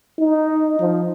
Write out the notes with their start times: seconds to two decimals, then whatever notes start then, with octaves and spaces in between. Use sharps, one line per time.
0.19 D#4
0.80 F3